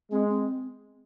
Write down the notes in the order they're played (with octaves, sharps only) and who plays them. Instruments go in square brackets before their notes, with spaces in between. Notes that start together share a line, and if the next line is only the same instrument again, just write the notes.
[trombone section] G#3 [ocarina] C4
[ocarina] C4